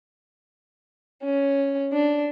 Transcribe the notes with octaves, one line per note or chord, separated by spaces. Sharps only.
C#4
D4